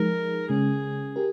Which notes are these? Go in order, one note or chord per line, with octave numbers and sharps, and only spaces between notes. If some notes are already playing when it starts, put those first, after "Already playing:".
Already playing: F3 G#3 D#4 G#4 A#4
C#3 G#3 C#4 G#4
G4 A#4